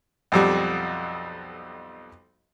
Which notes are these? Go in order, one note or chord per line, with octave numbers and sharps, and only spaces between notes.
B1 F2 G3